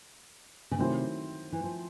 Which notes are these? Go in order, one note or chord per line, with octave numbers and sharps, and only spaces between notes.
C#3
C3 D#3 F#3 A3 C4 E4
E3
F3